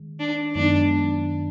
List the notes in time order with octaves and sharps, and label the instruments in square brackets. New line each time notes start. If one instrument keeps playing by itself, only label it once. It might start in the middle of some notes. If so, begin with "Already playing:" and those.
Already playing: [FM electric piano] D#3 G#3
[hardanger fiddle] D4
[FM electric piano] F#2 D#3 G#3 B3 D#4 [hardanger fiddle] D4